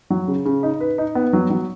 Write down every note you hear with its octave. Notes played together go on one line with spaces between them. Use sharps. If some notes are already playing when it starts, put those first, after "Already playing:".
F#3
C#3
C#3
D#4
B4
D#4
B3
F#3
F#3